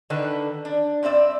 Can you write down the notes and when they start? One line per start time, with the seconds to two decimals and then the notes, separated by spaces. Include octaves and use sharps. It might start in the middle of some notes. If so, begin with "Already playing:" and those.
0.10 D3 D#3 D4 B4
0.65 D4
1.03 G2 C4 D5 E5